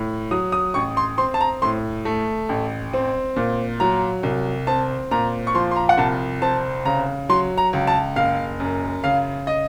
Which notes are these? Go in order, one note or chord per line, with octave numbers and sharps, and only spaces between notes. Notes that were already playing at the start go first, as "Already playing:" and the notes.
Already playing: A2
F#3 D#6
D#6
A1 C#6
C6
C4 C6
A5
A#5
A2 C6
A3
A1
C4
A#2
F#3 A#5
C2
C4 A5
A#2 A#5
C#6
F3 C6
C6
A#5
F#5
C2 A5
C4 A5
C#3 A#5
F#3 C6
A#5
C#2
A5
F#1 F5
F#2
C#3 F5
D#5